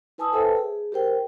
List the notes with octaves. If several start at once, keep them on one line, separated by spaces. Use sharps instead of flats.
E4 B4 G#5 A5 D#6 E6
A4 B4 C5 E5 G5 A5
G#4
G4 A#4 C5 G5